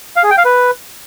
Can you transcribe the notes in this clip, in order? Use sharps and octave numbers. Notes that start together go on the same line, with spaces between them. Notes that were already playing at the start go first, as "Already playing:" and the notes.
F5
G#4
G5
F5
B4